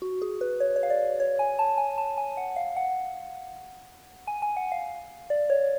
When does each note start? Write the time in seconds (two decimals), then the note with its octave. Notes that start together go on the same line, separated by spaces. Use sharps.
0.02 F#4
0.22 G#4
0.41 B4
0.60 C#5
0.76 C#5
0.83 F5
0.90 D5
1.20 C#5
1.39 G#5
1.59 A5
1.78 G#5
1.98 A5
2.18 G#5
2.37 F#5
2.56 F5
2.77 F#5
4.27 G#5
4.42 G#5
4.57 F#5
4.72 F5
5.30 D5
5.50 C#5